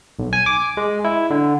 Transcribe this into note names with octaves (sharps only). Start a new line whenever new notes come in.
B1
G#5
D6
G#3
E4
D3